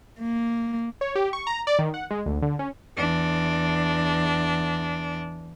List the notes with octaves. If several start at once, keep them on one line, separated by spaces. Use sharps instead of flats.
A#3
C#5
G4
C#6
A#5
D5
D#3
F#5
G#3
D2
D3
C#4
E2 D4